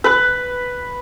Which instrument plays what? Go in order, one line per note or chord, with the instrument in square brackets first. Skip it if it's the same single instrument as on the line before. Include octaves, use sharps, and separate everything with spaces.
[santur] B4